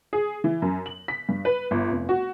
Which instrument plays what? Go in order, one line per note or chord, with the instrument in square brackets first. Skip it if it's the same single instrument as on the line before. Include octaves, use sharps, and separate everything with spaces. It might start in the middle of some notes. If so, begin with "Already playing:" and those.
[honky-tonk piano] G#4
E3
F#2
F#7
B6
G2
B4
G1
F1
F#4